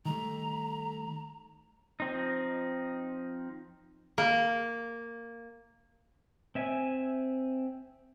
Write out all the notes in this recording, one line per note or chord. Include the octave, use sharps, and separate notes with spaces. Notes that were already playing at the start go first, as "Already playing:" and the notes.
D#3 G3 A3 A#5
F3 C4 D#4
A#3
C4 E5 G#5